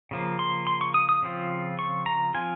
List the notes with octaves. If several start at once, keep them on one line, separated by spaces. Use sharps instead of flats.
C#3 F3 A#3
C6
C6
C#6
D#6
D#6
C#3 F3 C4 F4
C#6
A#5
F3 C4 F4 G#5